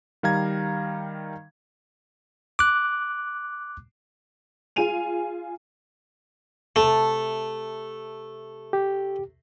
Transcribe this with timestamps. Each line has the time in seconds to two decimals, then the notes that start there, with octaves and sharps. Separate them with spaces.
0.23 D#3 G3 F5 A#5 G#6
2.59 D6 F#6
4.76 F4 G#4 G#5 D#7 F7
6.76 C3 A3 A5
8.73 G4